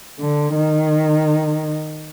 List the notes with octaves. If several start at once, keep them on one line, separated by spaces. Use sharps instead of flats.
D3
D#3